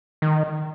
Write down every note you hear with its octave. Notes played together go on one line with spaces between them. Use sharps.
D#3